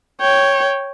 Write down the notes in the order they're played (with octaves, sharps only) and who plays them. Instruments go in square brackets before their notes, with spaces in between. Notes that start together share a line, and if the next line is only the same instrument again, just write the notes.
[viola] C#5 G5